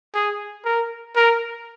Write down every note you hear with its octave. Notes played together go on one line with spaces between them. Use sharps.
G#4
A#4
A#4